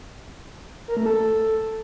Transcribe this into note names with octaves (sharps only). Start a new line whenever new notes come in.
A#4
A3
A4